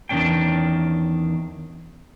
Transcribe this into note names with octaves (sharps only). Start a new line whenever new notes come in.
E2 D#3 F3 C#4 D4 G5